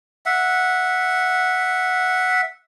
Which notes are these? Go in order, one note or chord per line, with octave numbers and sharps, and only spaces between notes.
E5 F#5